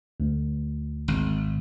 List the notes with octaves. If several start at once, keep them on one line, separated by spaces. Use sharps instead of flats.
D2
G#1